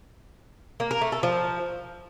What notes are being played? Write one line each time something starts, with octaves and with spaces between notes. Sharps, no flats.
A#3
A#4
A3
A4
F3